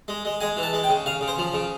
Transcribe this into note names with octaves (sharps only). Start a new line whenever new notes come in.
G#3
G#3
G#3 G#5
E3
A5
G#3
G5
C#3
C#3 F5
C#3
C5
F3
C#3